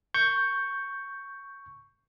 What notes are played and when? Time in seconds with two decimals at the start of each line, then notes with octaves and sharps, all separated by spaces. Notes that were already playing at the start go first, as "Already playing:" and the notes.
0.14 C#6 G6